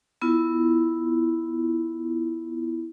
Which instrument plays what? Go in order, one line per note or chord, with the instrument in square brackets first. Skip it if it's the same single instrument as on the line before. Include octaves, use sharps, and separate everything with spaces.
[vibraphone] B3 E4 F4